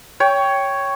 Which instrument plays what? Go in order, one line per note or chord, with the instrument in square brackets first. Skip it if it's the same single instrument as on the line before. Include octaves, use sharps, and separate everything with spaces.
[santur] C#5 G5